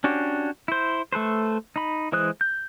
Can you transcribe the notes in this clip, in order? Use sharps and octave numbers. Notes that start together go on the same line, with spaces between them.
C#4 D4 F#4 G4
E4 C5
A3 A4 B4 C5
D#4 B5
E3 G#3 C5 D#6 F#6
G6